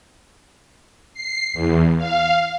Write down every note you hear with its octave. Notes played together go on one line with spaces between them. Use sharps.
C7
E2
F5